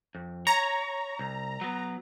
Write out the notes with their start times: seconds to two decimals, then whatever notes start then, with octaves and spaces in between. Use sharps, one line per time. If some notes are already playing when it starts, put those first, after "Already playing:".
0.15 F2
0.47 C#5 A#5
1.19 C2
1.61 F#3 B3